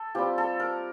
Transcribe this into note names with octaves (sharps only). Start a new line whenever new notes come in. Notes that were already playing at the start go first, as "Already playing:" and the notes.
Already playing: A4
G3 C4 F4 G4
A4
A#4